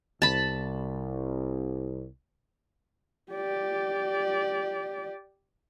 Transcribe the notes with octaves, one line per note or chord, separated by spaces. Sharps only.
C2 A5 B5
G4 D5